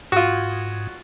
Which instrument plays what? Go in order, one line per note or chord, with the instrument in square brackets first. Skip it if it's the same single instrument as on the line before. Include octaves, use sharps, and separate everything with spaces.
[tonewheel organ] G#2 [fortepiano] F4 F#4